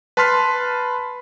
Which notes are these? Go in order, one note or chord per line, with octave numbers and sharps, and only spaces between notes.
B4 A5 B5 C6 F6 B6